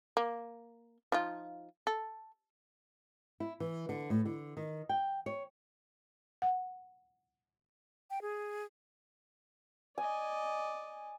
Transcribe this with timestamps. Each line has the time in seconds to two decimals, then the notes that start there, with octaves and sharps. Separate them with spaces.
0.17 A#3
1.12 F3 D#4 F4
1.87 A4
3.40 E4
3.60 E3
3.89 D3
4.10 A2
4.25 D3
4.57 D#3
4.89 G5
5.26 C#5
6.42 F#5
8.10 G5
8.22 G#4
9.98 D5 D#5 G#5